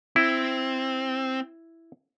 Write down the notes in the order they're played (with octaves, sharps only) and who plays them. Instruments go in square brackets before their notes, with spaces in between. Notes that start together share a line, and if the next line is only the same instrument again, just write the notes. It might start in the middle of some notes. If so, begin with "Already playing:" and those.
[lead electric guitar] C4 [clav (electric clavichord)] E4